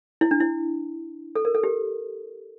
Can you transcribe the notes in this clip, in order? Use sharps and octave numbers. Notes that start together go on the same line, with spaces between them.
E4
D4
E4
A4
A#4
A4
G4